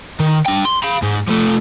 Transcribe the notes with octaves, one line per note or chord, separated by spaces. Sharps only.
D#3
D4 G5
C6
F5 B5
G#2
F3 A3